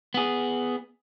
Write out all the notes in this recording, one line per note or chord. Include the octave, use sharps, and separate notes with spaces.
B3 G#4